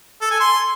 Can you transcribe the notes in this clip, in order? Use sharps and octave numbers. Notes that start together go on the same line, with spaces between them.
A4
G#5
C6